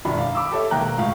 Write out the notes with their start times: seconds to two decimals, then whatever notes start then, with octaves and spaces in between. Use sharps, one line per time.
0.05 E1 F#2 D#3 D4 E4 B5
0.18 F5
0.35 B5 D6 E6
0.51 G4 A4 C#5 E5
0.71 E1 D#3 A#3 G5 A#5 F#6
0.97 C#2 A2 F5